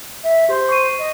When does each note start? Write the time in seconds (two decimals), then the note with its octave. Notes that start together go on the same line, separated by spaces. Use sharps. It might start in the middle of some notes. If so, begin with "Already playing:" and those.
0.23 E5
0.49 G4 C5
0.69 C#6 C7 D#7
0.99 D#5